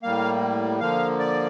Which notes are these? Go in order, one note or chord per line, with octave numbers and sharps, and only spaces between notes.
A2 G3 A#3 F5
D3 F3 A#3 F5
D5